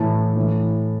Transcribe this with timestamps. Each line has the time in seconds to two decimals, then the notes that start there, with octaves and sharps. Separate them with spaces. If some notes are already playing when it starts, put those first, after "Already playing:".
Already playing: A2 E3 A5
0.36 A2 E3